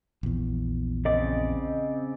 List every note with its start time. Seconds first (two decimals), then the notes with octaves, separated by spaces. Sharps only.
0.23 A#1 E2
1.05 C#3 C4 D5 D#5